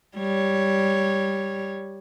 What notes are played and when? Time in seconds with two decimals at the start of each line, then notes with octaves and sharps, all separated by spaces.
0.17 G3 C#5